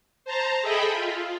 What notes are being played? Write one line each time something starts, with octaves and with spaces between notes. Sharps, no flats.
C5 A5 A#5
G#4 A4 D#5 E5 G5 B5
F4